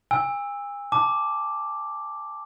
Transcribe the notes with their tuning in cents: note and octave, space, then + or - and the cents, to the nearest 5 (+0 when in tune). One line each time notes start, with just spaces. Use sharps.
G#5 -40 E6 -5
A5 +0 D6 +0